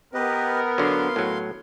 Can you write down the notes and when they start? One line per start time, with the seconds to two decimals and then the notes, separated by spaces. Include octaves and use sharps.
0.14 B3 G4 A#4 B4 D#5
0.78 D3 F#3 F5 C6
1.16 A2 F#3